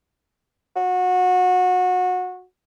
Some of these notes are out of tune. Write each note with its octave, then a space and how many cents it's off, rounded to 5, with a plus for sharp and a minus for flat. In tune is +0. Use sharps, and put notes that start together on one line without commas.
F#4 -25